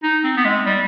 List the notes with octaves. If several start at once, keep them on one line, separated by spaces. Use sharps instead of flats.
D#4
C4
B3
G#3
G3